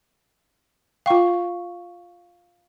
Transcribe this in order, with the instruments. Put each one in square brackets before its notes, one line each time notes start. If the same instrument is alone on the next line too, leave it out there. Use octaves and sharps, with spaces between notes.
[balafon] F4 G5 [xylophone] F5 C#6